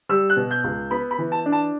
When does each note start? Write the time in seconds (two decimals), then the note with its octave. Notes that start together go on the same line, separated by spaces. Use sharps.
0.09 G3 E6
0.30 F#6
0.36 B2
0.51 G6
0.64 C#2
0.91 B3 B5
1.11 B5
1.18 E3
1.32 A5
1.46 D4
1.52 A5